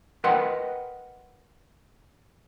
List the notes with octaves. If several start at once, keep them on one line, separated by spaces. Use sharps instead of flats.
A#4 B4 D#5 F#5 G5 C6